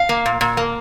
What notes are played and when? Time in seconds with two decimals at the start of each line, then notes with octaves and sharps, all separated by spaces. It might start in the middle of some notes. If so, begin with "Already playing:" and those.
Already playing: F5
0.09 A#3
0.26 A#2
0.41 A#2
0.57 A#3